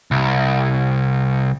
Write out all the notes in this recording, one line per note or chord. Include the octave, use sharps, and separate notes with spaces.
C2